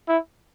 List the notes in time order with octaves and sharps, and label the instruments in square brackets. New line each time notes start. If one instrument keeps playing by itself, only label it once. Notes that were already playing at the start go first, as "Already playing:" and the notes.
[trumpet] E4